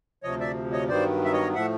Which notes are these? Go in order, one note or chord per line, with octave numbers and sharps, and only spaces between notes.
D2 C3 F3 C#5 D#5
D5 E5
C#5 D#5
G2 D#3 F#3 B3 C5 D5
E5
C#5 D#5
A2 F3 A3 E5 F#5